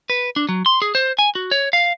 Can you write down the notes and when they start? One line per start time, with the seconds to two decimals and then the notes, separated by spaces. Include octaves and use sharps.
0.10 B4
0.36 D4
0.49 F#3
0.66 C6
0.82 G#4
0.95 C5
1.19 G#5
1.35 F#4
1.51 C#5
1.73 F5